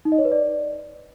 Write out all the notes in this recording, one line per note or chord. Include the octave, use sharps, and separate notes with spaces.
D#4
D#5
C#5
B4
D5